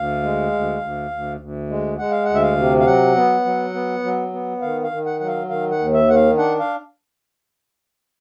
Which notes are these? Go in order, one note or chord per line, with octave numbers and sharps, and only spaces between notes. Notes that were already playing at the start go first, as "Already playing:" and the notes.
Already playing: D2 F5
G#3
D2
D2
D2
D2
G#3
G#3 F#5
F5
D2 F#5
E5
F5
C3
F5
F#3 F#5
B3
F#3
B3
F#3
B3
D#3 F5
F5
D#3
F#5
F#3 F#5
F5
D#3 F5
F#5
D#2
E5
D#3 F#5
F5
D4 F#5
F5